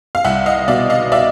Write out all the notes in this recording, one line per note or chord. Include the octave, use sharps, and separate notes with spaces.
F5
C2 E5 F#5
D#5 F5
B2 D5 E5
D#5 F5
D5 E5